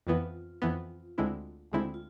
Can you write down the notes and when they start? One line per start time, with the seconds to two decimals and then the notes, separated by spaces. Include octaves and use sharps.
0.07 F2 E3 B3 F4
0.62 F2 E3 B3
1.18 D2 D3 G#3 C4 E4
1.72 D2 D3 G#3 C4 E4
1.94 F4